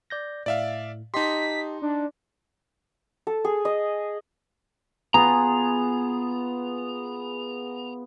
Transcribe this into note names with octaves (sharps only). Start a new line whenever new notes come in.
D5 G6 A#6
A2 D5 E5 F5
D#4 G4 D#5 A5 C6 B6
D4
A4
G#4
D#5
B3 F4 G#4 A#5